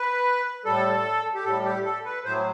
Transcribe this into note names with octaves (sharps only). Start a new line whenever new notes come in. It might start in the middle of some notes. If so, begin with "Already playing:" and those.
Already playing: B4
A2 G3 A4
G4
A2 G3 A4
G4
A4
B4
A2 F#3 C5